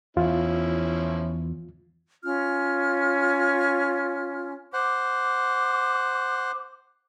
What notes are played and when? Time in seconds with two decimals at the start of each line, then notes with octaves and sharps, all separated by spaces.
0.17 E2 F3 C#4 E4 F4
2.24 C#4 F4 F6
4.73 C5 F#5 D6